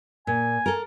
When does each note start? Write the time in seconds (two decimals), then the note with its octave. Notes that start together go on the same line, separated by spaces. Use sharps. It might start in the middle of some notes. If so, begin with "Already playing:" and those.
0.27 A#2 G#5
0.66 A4 A#4